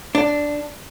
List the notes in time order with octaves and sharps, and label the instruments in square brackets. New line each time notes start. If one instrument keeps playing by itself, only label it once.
[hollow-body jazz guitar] D4